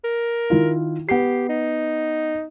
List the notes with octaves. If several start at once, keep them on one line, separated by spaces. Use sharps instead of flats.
A#4
D#3 E4 F4
B3 G4 C7
D#4